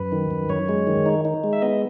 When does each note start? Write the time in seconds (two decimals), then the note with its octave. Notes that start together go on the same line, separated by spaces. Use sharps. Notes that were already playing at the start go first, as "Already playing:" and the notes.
Already playing: F#2 B4
0.12 D#3
0.31 F#2
0.49 F#2 C#5
0.69 G#3
0.87 D#3
1.06 D#4
1.25 D#4
1.44 G#3
1.53 E5
1.62 B3 D#5